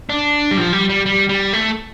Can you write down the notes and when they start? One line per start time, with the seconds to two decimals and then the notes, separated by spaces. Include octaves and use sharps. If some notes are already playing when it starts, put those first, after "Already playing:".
0.09 D4
0.51 G3
0.57 F3
0.73 G3
0.89 G3
1.06 G3
1.29 G3
1.53 A3